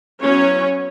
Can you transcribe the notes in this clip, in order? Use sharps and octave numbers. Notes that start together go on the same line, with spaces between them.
F#3 B3 C#4 E4 C#5